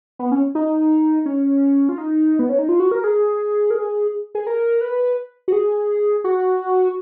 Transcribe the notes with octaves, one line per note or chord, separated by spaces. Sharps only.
B3
C#4
D#4
C#4
F4
D#4
B3
C#4
D#4
F4
F#4
A#4
G#4
A#4
G#4
G#4
A#4
B4
F#4
G#4
F#4